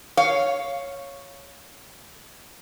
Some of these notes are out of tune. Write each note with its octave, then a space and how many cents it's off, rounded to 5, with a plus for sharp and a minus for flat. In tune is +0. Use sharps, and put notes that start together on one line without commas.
C#5 +0 F5 +0